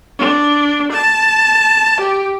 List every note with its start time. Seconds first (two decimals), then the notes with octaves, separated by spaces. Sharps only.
0.19 D4
0.92 A5
2.01 G4